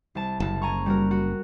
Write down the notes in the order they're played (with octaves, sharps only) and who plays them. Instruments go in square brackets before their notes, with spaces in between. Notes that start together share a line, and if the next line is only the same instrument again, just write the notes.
[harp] C2 A5
[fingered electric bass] F#1 [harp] A5
[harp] G#5 A#5 C#6
G3 F#4 A#4
F#4